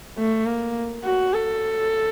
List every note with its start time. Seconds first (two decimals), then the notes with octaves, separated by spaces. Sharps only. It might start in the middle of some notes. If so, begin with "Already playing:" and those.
0.18 A3
0.46 A#3
1.04 F#4
1.33 A4